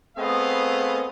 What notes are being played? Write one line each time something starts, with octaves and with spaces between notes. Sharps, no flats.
A3 B3 C4 G#4 D#5 F5